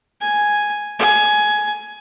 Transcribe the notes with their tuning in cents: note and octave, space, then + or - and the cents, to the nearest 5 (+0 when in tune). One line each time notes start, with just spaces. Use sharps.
G#5 +0
G#5 +15